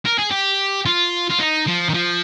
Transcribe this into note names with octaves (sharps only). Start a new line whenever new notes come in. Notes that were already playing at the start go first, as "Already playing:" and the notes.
A#4
G#4
G4
F4
F4
D#4
F3
D#3
F3